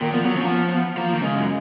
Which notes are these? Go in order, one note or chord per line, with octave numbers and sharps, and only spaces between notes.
A#2 D#3
F3 B3
F#3 B3
F3 C#4
A#3
B3
B3
F3 A#3
D#3
C#3 G#3
F#2